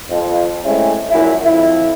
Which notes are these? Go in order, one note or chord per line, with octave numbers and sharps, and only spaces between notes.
F2
G#3 A3 C4 C#4 E4
A#1 F#2 E4
F2 E4